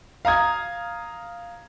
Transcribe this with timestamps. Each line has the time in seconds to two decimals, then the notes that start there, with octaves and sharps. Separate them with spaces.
0.25 F5 A#5 D#6 G#6